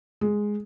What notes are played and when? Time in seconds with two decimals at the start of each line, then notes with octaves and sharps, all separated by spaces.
0.21 G#3